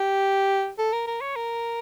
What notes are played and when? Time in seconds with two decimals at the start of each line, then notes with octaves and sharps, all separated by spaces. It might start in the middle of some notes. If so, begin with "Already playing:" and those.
Already playing: G4
0.78 A4
0.93 A#4
1.07 A#4
1.21 C#5
1.36 A#4